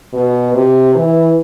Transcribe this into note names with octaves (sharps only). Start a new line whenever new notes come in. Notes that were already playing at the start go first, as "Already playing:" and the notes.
B2
C3
E3